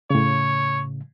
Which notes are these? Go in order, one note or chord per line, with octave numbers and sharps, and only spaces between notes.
A2 C#3 C#5